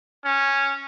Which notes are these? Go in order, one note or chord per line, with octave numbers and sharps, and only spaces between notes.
C#4